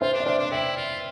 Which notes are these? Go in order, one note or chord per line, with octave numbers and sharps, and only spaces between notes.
F4 C5 E5
D4
D5
D4 C5 E5
D4
E4 E5 G5
F4